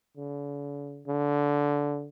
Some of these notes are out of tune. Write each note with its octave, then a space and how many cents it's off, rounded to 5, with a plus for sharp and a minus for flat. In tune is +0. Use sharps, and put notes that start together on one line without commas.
D3 -45
D3 -15